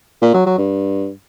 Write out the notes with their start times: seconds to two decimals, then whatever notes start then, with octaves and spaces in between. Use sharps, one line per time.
0.22 A#2
0.34 F#3
0.46 F#3
0.58 G2